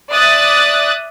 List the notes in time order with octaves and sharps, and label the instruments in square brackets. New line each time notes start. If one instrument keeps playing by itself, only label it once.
[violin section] D5 E5 D#6 F#6 A6